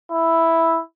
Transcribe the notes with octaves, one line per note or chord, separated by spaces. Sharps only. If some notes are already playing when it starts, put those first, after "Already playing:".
E4